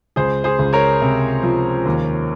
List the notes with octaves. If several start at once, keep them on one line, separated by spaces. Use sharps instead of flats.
C#2 G#4 C5
G#4 C5
C#2
A#4 C#5
C3
F3
D#2